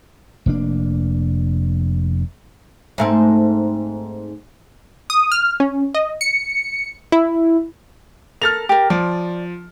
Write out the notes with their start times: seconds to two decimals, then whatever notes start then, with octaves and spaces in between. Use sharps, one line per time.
0.46 F1 A#3 D4
2.98 G#2 A3 C4
5.10 D#6
5.32 F6
5.60 C#4
5.94 D#5
6.21 C#7
7.12 E4
8.42 A4 A#4 F6 A6 F7
8.69 G4 A#4
8.90 F3 D5